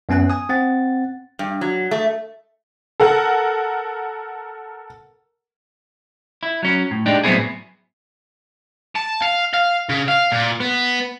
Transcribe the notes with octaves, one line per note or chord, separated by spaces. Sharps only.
F#2 B3 C#4 G#5 F#6
G#5 D#6
C4 F#5 A6
G2
F#3
A3
A4 A#4 F#5
E4
F#3 C#4
A2
G#3 D4 D#4 G4
A2 F#3 B3 C4 E4 G#4
A5
F5
F5
C#3
F5
A#2
B3